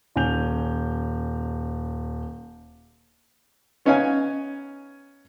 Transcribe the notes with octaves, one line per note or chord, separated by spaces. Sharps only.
D#1 C#4 G#5 G6 F7
B3 C#4 D#4 C#5 F5 G#5